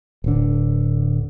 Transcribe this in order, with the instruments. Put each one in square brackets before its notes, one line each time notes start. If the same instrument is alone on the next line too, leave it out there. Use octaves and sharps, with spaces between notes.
[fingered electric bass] D1 D3